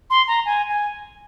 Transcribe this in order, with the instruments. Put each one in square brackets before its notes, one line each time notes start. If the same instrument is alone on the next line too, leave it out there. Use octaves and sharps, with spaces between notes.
[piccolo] C6
A#5
G#5
G#5